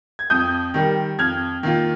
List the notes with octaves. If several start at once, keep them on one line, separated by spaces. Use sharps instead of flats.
G#6
F2 D#6 G6
D#3 G3
F2 F6 G#6
D#3 A#3 F4